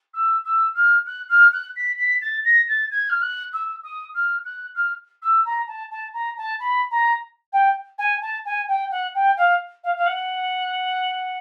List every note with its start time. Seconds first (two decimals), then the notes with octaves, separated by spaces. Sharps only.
0.14 E6
0.45 E6
0.75 F6
1.06 F#6
1.29 F6
1.53 F#6
1.76 B6
1.98 B6
2.21 A6
2.45 A#6
2.68 A6
2.91 G#6
3.09 F6
3.22 F#6
3.53 E6
3.83 D#6
4.14 F6
4.45 F#6
4.75 F6
5.22 E6
5.45 A#5
5.67 A5
5.91 A5
6.13 A#5
6.37 A5
6.60 B5
6.91 A#5
7.53 G5
7.98 G#5
8.22 A5
8.45 G#5
8.68 G5
8.91 F#5
9.15 G5
9.37 F5
9.84 F5
9.97 F5
10.06 F#5